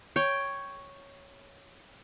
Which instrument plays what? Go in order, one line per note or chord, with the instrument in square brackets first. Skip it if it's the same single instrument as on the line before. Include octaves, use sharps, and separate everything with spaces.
[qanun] C#5 G5